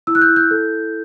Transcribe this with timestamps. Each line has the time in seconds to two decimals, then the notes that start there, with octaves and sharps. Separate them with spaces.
0.07 E4 E6
0.15 F#6
0.22 G6
0.29 E4
0.36 G6
0.51 A4